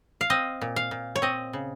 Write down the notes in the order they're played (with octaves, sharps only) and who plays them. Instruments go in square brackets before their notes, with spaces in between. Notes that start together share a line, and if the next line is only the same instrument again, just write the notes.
[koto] F5
C4 D#5
A#2
F5
A#2
C#5
C4 D#5
C#3